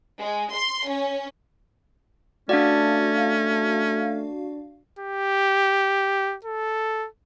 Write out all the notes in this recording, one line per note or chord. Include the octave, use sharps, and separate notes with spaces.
G#3
C6
C#4
A3 C#4 D4 F#4 D5 F5
G4
A4